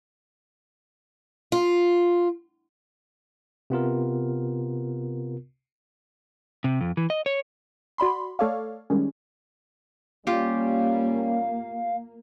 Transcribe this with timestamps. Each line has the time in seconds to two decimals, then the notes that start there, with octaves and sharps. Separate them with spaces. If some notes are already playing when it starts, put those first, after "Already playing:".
1.52 F4
3.70 C3 B3 F4 A#4
6.64 C3
6.81 F2
6.97 E3
7.10 D#5
7.26 C#5
7.98 F#4 D5 B5 C6
8.39 A3 A4 C#5 D5 F5
8.90 D#3 G3 G#3 C#4
10.27 G3 A#3 C#4 F4 G4 F5